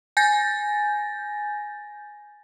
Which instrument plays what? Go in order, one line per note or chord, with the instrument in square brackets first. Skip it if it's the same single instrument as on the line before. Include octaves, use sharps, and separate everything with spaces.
[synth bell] G#5 G6 A6 A#6